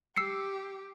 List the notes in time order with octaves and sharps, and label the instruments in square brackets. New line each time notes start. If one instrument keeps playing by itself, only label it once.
[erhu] G4 [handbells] E6 C7 C#7